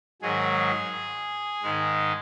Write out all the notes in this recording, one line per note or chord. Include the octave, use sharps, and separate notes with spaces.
G#2 D#3 F#3 G#4
G#2 D#3 G#3